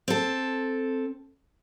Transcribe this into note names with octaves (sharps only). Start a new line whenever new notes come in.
C4 A4